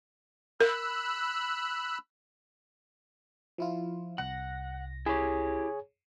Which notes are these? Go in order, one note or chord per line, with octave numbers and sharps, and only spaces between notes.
A#4 B5 E6 F#6
F3 E4 F4
C2 F#5 A#6
E4 G4 G#4 C#5